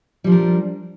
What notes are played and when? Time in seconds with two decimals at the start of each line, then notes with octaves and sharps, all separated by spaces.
0.24 G3
0.27 F3
0.29 D4
0.32 A#4